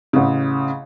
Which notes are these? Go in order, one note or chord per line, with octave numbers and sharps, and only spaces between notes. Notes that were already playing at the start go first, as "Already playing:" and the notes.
A1 C#3